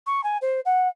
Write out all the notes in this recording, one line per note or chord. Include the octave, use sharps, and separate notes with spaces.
C#6
G#5
C5
F#5